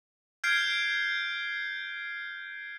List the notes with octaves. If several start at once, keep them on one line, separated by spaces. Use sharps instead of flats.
F6 G6 G#6 C7 D7